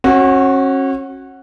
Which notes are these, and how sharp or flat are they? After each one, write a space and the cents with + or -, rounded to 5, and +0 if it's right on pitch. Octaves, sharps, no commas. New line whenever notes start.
C#4 -35 F#4 +0